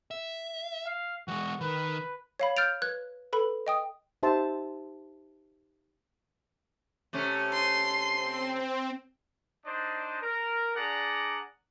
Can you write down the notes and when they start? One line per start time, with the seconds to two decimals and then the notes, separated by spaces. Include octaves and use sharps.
0.11 E5
0.86 F5
1.28 E3 G#3 F#4
1.61 D#3 B4
2.40 C#5 F5 B5
2.57 F6 G6 A6 D7 F7
2.82 B4 F#6 G#6
3.33 A4 B4 B5
3.67 D#5 G5 D#6
4.23 D#4 G4 C5 E5 A5 C6
7.13 C3 A3 C#4
7.53 C6
8.13 C4
9.65 D4 D#4 C5 D5 D#5
10.22 A#4
10.75 D4 G#4 D5 F#5 A#5